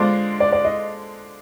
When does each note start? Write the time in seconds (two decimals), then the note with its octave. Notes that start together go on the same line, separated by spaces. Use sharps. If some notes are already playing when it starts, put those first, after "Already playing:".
Already playing: D3 G#3 D4 F4 C5
0.40 D5
0.52 D5
0.65 D#5